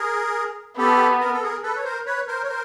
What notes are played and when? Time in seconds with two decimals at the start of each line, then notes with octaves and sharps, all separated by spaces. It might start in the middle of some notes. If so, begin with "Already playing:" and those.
Already playing: G#4 A#4
0.78 B3 G4 A4
1.20 A#4
1.32 A4
1.43 G#4 A#4
1.63 A4 B4
1.76 C#5
1.84 A#4 C5
2.06 B4 C#5
2.27 A#4 C5
2.43 C#5
2.48 A#4 C5